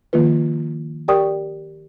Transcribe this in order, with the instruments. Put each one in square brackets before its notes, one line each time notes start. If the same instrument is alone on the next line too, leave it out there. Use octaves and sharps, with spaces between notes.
[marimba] D#3 F3 A#3 F4 B4
G4 A#4 D5 G5 C#6 D#6